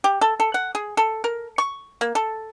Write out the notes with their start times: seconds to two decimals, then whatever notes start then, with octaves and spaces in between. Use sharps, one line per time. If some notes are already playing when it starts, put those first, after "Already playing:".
0.04 G4
0.21 A4
0.40 A4
0.54 F#5
0.75 G#4
0.97 A4
1.24 A#4
1.58 C#6
2.01 A#3
2.15 A4